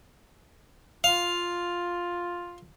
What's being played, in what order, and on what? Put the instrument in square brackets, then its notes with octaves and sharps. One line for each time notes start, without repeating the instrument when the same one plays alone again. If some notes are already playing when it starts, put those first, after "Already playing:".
[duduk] F4 [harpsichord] F5